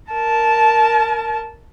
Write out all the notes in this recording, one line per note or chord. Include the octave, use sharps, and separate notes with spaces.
A#4 A5